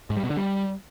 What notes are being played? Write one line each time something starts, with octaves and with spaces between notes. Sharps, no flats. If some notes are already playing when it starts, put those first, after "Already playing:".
G#2
G3
B2
D3
G3